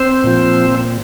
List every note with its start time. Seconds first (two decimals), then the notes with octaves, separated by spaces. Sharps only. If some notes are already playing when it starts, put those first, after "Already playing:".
Already playing: C4 C5
0.24 A#2 F3